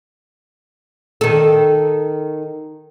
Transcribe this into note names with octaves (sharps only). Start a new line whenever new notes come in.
D#3 A4